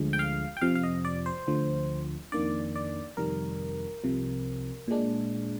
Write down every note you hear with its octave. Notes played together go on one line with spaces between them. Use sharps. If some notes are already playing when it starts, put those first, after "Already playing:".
Already playing: D2 D3 F3 G#3
G5
F5
G5
F2 C3 F3 F5
F5
D#5
D5
C5
D2 D3 F3
F2 D#3 A#3 D4 D5
D5
F2 C3 D#3 G3 A#4
C2 C3 F3
A#2 G#3 D4